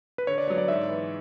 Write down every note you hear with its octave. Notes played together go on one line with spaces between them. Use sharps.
B4
D3 C#5
D5
F#3 B3 C#5
D5
G#2 E5
E3 B3